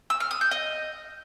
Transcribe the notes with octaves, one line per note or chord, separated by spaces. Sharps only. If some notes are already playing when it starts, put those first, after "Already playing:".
E6
F6
D#6
G6
D#5